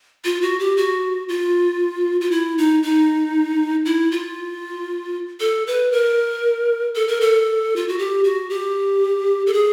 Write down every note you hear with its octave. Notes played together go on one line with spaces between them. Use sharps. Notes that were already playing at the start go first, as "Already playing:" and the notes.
F4
F#4
G4
F#4
F4
F4
E4
D#4
D#4
E4
F4
A4
B4
A#4
A4
A#4
A4
F4
F#4
G4
F#4
G4
A4
G#4